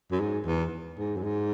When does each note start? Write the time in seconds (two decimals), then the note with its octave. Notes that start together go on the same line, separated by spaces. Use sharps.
0.11 F#2
0.20 G#2
0.46 E2
0.98 G#2
1.16 F#2
1.24 G#2